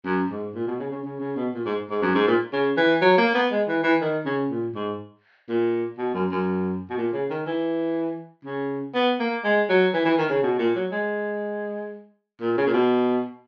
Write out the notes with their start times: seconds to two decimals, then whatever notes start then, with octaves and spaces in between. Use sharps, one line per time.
0.05 F#2
0.30 G#2
0.54 A#2
0.67 B2
0.79 C#3
0.92 C#3
1.04 C#3
1.20 C#3
1.36 B2
1.54 A#2
1.66 G#2
1.90 G#2
2.02 F#2
2.15 G#2
2.27 A#2
2.53 C#3
2.77 E3
3.02 F#3
3.18 A#3
3.35 B3
3.51 G#3
3.68 E3
3.83 E3
4.01 D#3
4.26 C#3
4.50 A#2
4.75 G#2
5.49 A#2
5.98 B2
6.14 F#2
6.31 F#2
6.90 B2
6.97 A#2
7.13 C#3
7.30 D#3
7.46 E3
8.45 C#3
8.94 B3
9.20 A#3
9.44 G#3
9.69 F#3
9.94 E3
10.05 E3
10.18 D#3
10.30 C#3
10.43 B2
10.59 A#2
10.75 F#3
10.92 G#3
12.41 A#2
12.58 C#3
12.67 A#2
12.74 B2